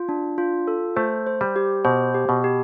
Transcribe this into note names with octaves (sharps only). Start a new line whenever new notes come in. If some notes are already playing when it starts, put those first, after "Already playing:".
Already playing: F4
D4
F4
A4
A3 C5
C5
G3
G4
B2 C5
G4
B2
G4